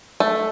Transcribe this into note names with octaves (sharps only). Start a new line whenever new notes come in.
A3